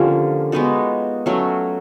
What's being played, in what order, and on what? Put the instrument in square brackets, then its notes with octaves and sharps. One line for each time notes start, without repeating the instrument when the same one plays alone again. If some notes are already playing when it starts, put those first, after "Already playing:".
Already playing: [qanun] D3 F3 A#3 C#4 [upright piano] F4 G4
[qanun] G#3 B3 D#4 F#4
F#3 A3 C#4 F#4